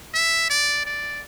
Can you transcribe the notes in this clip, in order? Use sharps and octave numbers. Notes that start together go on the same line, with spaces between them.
E5
D5
D5